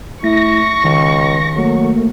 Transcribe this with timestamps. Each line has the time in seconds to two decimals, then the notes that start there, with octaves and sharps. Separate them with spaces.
0.24 A3 E4 C#6 A#6
0.84 C#2 D#3
1.56 F#3 A3 A#3